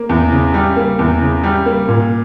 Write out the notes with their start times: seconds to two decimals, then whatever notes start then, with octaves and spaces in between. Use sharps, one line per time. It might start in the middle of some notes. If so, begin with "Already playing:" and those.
Already playing: A#3
0.09 E2
0.32 C#3
0.54 G3
0.76 A#3
0.99 E2
1.21 C#3
1.43 G3
1.66 A#3
1.88 A#2